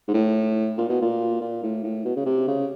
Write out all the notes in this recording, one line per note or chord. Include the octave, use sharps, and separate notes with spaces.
G#2
A2
A#2
B2
A#2
A#2
A2
A2
B2
C#3
C3
C#3